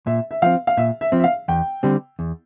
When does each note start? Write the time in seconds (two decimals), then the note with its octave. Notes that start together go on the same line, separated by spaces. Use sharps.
0.07 A#2 E5
0.31 E5
0.42 F3 C4 F5
0.67 F5
0.77 A#2 E5
1.01 E5
1.12 F3 C4
1.19 E5
1.24 F5
1.48 E2 G5
1.83 D3 G3 C4 G4
2.19 E2